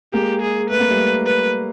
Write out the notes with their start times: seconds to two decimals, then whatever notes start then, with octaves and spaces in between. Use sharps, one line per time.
0.13 G#3 A#3 G4
0.41 G#4
0.70 A3 B4
0.80 A#3
0.90 G3 A3
1.26 B4